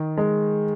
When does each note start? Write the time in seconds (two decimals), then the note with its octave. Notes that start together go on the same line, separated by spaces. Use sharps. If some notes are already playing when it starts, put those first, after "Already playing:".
Already playing: D#3
0.18 G#3